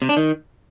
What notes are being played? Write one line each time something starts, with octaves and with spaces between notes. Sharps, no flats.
C3
D4
D#3